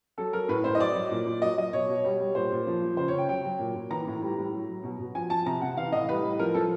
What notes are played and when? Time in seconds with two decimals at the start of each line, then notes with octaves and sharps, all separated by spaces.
0.18 F#3 A4
0.33 F#3 A#4
0.49 A2 B4
0.64 A2 C5
0.75 D#5
0.80 F#3 D5
0.95 F#3
1.11 A#2
1.27 A#2
1.42 F#3 D#5
1.58 F#3 D#5
1.73 B2 C#5
1.88 B2
2.04 G3
2.20 G3
2.35 A#2 C5
2.52 A#2
2.67 F3
2.82 F3
2.97 C#3 C5
3.08 C#3 C#5
3.18 G5
3.29 F#3 G5
3.45 F#3
3.59 A#2
3.75 A#2
3.90 E3 A#5
4.07 A2
4.22 G3
4.38 A2
4.53 F#3
4.69 F#3
4.83 B2
4.99 B2
5.15 F3 G#5
5.30 F3 A5
5.46 C3 A#5
5.61 C3 F#5
5.77 E3 F5
5.92 A2 D#5
6.08 G3 B4
6.23 A2
6.39 F3 A#4
6.54 F3 A4